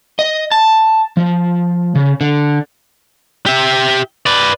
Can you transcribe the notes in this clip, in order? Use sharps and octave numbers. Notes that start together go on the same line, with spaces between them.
D#5
A5
F3
C#3
D3
G4 E5
B4 D5